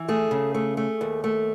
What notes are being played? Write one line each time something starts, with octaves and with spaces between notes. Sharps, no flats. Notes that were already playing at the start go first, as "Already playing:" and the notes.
Already playing: E3
A3 G#4
C#3
A3
A3
D#2
A3